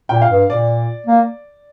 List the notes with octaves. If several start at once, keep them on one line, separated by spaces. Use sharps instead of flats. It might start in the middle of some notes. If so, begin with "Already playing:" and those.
A#2 G5
F5
G2
A#2 D5
A#3